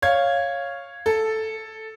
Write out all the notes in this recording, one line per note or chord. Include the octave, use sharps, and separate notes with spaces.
C#5 F5 G#6
A4